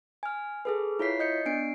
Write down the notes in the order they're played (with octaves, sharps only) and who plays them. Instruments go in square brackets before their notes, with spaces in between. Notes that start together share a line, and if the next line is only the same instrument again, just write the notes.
[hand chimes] G#5 F6
G#4 A4 B4
E4 F4 C#5 B6 C7
D#5 G6 C#7
B3 D4 C7 D7